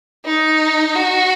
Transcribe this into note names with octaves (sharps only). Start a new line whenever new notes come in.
D#4
F#4